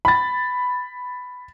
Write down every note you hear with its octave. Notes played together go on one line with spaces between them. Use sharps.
B5 A6